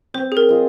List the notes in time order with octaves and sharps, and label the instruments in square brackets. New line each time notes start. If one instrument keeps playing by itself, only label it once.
[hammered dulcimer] C4 [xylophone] C5
[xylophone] G#4
A#4
[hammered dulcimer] F4 G#4 D#5